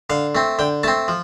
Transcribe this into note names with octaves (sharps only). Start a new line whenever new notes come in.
D3 F5
A3 C4
D3 G5
A3 C4 A5
F3